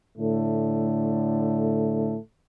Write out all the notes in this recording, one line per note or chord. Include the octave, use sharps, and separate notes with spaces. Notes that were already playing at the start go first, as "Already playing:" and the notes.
A2 D3 A3